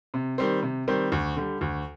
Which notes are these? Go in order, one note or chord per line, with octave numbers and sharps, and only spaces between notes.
C3
D#3 G3 C4
C3
D#3 G3 C4
D2
D3 G3
D2